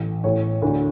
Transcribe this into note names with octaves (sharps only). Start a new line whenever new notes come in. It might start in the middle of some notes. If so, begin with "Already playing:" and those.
Already playing: A1 A2 E3
A1 A2 E3 C#5
D2 D3